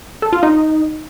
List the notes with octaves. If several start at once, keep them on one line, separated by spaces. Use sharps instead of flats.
A4
F4
D#4